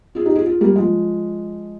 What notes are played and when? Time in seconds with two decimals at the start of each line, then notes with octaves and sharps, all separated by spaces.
0.15 F4 G#4
0.26 D#4 G4
0.36 F4 G#4
0.46 F4 G#4
0.61 G3 A#3
0.76 F3 G#3